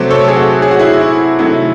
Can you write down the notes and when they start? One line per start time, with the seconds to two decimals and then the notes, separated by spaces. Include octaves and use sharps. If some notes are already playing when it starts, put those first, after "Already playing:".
Already playing: C3 F#3 A3 C5
0.10 A4 C#5
0.28 G#4
0.36 F#4 A4
0.62 G#4
0.71 F#4
0.79 E4 G#4
1.01 E4
1.39 C3 D#3 F#3 A3 E4